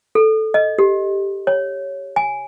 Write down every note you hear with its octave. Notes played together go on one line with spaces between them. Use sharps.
A4
D#5
G4
C#5
G#5